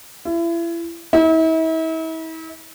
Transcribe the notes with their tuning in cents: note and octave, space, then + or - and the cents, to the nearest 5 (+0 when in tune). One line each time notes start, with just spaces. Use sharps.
E4 +35
E4 -40